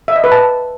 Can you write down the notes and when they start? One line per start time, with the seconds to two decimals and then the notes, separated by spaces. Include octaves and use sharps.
0.08 E5
0.16 D#5
0.24 B4
0.32 A5